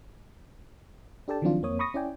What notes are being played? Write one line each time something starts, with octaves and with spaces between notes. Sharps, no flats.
D4 G4 A4 D5 G5 A5
D#3 F3 F#3 C4 D4 F4
F2 A#3 C4 C#5 D#6
B5 C#6 D#6 A#6
C#4 E4 D5 G5 G#5